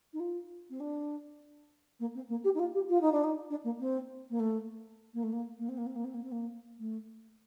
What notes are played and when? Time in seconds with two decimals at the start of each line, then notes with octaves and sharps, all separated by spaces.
0.13 D#4
0.20 F4
0.70 C4
0.80 D4
2.00 A#3
2.15 C4
2.29 A#3
2.44 G4
2.54 D#4
2.59 F4
2.74 G4
2.89 F4
3.01 D#4
3.12 D4
3.24 D#4
3.50 D4
3.64 A#3
3.80 C4
4.30 A#3
4.40 A3
5.14 A#3
5.23 A3
5.32 A#3
5.58 A#3
5.69 C4
5.77 A#3
5.86 C4
5.95 A#3
6.04 C4
6.14 A#3
6.24 C4
6.32 A#3
6.79 A3